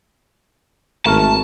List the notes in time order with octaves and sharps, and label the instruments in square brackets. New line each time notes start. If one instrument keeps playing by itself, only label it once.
[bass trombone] G#1 [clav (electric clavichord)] A3 A#4 [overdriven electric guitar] A5